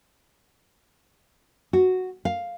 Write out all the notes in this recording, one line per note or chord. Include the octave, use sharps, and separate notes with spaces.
F#4
F5